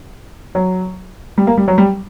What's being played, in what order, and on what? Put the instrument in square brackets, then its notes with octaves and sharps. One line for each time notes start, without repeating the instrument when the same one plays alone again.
[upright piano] F#3
G3
A#3
G3
F#3
G3